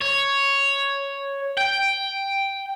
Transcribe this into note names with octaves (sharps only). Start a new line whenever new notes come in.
C#5
G5